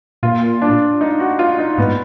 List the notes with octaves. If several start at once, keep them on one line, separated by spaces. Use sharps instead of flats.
A#2 F4
D4
D#4
F#4
F4
D#4
G#2 B3